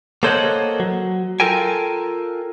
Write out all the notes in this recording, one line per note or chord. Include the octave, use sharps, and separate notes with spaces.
A#3 A4 C5 C#5 D#5 F#5
F#3
F4 A4 A#4 G5 G#5